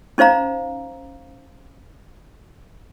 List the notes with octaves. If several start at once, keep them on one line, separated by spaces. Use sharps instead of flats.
C#4 D#4 C5 F5 A#5